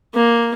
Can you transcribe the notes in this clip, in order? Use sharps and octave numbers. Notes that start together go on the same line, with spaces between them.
A#3